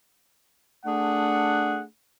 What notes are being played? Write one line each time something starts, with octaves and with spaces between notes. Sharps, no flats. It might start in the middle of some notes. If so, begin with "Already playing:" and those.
A3 D4 G#4 F#5